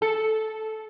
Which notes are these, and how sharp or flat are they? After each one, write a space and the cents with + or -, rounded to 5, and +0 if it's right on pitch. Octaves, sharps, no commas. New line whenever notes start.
A4 -10